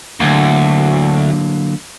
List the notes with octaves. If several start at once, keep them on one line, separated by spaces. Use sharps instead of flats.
D2 D3 F#3 A#3